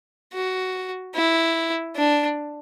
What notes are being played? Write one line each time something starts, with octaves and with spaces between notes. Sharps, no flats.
F#4
E4
D4